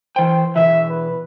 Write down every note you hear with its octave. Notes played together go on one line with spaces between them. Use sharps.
E3 C5 G5
B2 E3 E5
B4